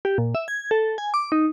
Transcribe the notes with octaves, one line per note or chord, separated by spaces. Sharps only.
G4
A#2
E5
G#6
A4
G#5
D6
D#4